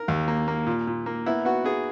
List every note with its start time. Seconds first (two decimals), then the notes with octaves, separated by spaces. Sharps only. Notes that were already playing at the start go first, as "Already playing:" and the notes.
Already playing: A#4
0.08 D#2
0.28 A#3
0.48 A#3
0.66 A#2
0.87 A#2
1.06 A#3
1.26 B3 E4
1.45 B3 F#4
1.64 B3 G#4